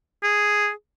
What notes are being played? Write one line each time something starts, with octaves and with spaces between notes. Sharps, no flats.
G#4